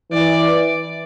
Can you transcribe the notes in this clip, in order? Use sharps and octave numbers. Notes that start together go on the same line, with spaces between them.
E3 D5